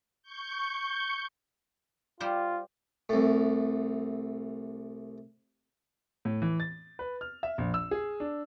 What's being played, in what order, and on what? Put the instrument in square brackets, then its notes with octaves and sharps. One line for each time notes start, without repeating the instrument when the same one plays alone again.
[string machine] C#6 G6
[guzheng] G3 C5 [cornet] F4
[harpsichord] C2 A2
[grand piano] A2
E3
A6
B4
F6
E5
A#1
E6
G#4
D4